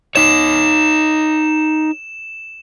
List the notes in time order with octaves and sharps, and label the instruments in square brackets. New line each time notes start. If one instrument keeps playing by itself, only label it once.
[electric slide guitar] D#4 C#5 [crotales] E7